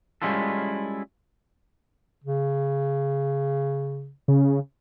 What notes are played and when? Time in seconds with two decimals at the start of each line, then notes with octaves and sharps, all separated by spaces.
0.22 G3 G#3 C#4 E4 F4 A4
2.24 C#3
4.28 C#3